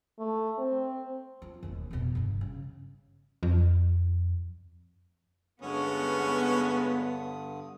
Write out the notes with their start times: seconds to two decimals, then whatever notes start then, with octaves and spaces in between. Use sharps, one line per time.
0.19 A3
0.58 C4
1.42 F4
1.63 E1 D#2
1.91 F1 B2
2.15 G1 G2
2.41 C#3
3.43 F2
5.62 G2 D3 G#3 B3 C#4 F#4 D#6